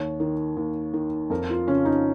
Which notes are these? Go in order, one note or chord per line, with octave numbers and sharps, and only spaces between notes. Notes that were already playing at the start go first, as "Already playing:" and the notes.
Already playing: D#2 C#5
D#3
D#2
D#3
F2 A#4
F4
C#3 C#4
D#4